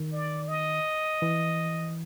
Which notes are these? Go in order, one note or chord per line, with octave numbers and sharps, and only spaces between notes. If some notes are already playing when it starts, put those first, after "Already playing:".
Already playing: D#3
D5
D#5
E3